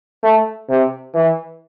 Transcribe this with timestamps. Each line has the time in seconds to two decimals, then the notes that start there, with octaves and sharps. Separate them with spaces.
0.23 A3
0.69 C3
1.14 E3